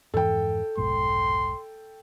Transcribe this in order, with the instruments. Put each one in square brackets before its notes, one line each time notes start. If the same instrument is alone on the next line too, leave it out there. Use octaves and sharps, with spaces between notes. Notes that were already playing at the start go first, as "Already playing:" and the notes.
[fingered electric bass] F2 G#2 E3 [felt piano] A4 G5
[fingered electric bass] F1 B1 G#2 [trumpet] C6